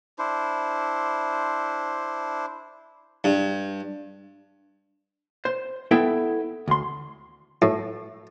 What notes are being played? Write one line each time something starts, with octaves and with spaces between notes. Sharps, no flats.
D4 E4 C5
G2
C5
B3 E4 A4 E5 G5
D2 C6
A2